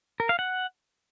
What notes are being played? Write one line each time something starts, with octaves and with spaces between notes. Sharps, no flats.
A#4
F5
F#5